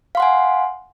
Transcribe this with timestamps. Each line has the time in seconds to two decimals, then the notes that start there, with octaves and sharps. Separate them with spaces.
0.15 F5
0.17 C6
0.20 F#5
0.22 G#5